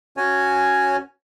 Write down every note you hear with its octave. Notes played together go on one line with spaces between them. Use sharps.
C#4 F#4 C#5 G#5